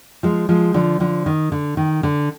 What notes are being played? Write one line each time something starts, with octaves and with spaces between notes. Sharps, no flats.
F3 G#3
F3 G#3
D3 F3
D3 F3
D#3
D3
D#3
D3